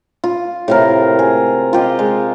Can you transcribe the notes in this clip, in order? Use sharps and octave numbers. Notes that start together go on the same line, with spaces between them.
F4
A2 C3 A#4
G#4
F4 G4 D#5
G#3